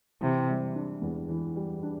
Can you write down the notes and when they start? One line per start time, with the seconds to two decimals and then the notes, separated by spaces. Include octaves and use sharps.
0.21 C3 E3
0.48 G3
0.75 D4
1.01 E2
1.28 E3
1.56 G3
1.83 D4